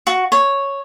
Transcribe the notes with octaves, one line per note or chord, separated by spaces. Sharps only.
F#4
C#5